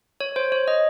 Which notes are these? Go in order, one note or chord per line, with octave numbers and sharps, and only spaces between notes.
C#5
C5
C#5
D#5